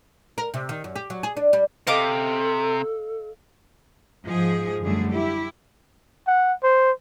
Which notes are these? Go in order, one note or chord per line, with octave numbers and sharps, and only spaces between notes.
A#4
C3
D#3
F#2
G4
F#3
G#4
D4
G3
C3 A4 D#5 F5 D6
G#2 F3 G#4
F#2 D3 G3 A3 G#4
E4 G4
F#5
C5